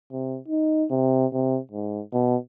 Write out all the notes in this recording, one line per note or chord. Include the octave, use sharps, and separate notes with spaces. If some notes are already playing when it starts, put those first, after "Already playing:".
C3
D#4
C3
C3
G#2
B2